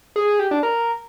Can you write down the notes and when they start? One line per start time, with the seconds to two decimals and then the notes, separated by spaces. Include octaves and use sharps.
0.16 G#4
0.28 G#4
0.39 G4
0.51 D4
0.63 A#4